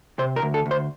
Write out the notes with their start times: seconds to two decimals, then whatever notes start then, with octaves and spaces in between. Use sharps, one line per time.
0.19 C3 C5
0.36 A#4
0.42 D2
0.54 A4
0.66 D2
0.71 C5